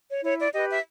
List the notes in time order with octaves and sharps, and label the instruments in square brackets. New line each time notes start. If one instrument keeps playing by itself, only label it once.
[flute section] C#5
E4 C#5
D5
G4 B4 D#5
E5